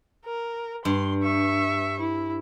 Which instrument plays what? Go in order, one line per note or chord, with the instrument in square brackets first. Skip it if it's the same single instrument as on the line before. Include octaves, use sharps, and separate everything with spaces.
[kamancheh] A#4
[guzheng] G2 [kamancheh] C6
[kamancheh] E5 C#6
E4